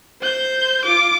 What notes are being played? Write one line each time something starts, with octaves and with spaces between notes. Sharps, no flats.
C5 G6
F4 D6